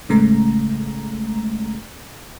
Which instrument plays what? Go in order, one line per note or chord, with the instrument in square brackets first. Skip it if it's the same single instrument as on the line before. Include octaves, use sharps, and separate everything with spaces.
[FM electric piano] A1 C#3 G#3 A3 A#5